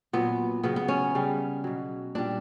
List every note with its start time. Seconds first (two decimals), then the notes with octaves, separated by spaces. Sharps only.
0.13 A#2 F#3 B3
0.63 C#3 F#3 B3
0.76 B3
0.88 C#4
1.15 C#3 G3
1.64 B2 F#3
2.15 A#2 G3 D4